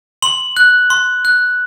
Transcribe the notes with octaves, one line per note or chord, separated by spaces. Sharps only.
C6 F#7
F#6
C6
F#6